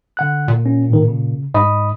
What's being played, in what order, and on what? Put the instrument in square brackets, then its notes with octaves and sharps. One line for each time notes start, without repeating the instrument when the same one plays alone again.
[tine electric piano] D3 F#5 F#6
[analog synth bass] A#2
[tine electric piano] C#4
A2 D#3
C#3
[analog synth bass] G#2 [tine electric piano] D#5 B5 D#6